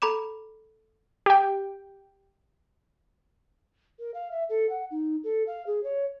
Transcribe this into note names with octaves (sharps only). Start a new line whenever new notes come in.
A4 A#5 B5 D6 E7
G4 G5
A#4
F5
E5
A4
F#5
D#4
A4
F5
G#4
C#5